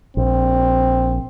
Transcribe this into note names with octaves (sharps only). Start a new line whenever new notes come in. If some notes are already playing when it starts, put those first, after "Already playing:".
A#1 C4